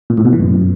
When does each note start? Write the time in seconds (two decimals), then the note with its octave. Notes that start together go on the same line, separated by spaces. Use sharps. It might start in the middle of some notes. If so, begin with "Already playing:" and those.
0.10 A#2
0.17 A2
0.25 B2
0.33 E3
0.40 F#2